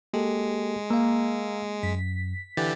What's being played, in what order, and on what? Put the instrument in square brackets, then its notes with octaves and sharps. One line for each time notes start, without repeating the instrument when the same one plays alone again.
[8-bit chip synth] G#3 [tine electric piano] A#3 G4 A4
[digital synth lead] A#3 [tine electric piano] F5 E6
[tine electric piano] F#2 [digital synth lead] B6
[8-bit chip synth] D3 E3 G4 [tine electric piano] G5 A6